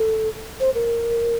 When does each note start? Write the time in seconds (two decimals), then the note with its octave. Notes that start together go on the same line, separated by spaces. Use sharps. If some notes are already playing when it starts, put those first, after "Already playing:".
Already playing: A4
0.60 C5
0.75 A#4